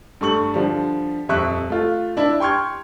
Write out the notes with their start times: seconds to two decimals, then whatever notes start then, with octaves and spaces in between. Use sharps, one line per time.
0.21 G2 A3 C#6 F#7
0.54 D3 F3 G3
1.29 D#1 F2 E5 C#6 F#6
1.70 A3 F4
2.17 D4 E4
2.40 G5 C6 C#6 F6 G#6